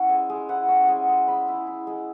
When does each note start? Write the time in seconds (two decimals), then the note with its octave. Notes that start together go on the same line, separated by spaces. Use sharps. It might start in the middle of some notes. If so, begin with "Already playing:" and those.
Already playing: C#4 E4 F#5
0.09 G#3 G#5
0.30 G#3
0.49 E4 F#5
0.68 C#4
0.84 G#3 F#5 G#5
1.08 G#3
1.28 G#3 B5
1.48 E4
1.67 E4
1.87 G#3